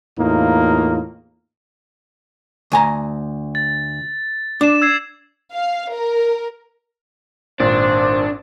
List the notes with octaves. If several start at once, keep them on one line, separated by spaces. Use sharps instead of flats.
E2 A2 A#3 D#4 F4
D2 G#5 A#5
A6
D4 D6 E7
E6 G#6 C7
F5
A#4
G#1 A#2 D4 C5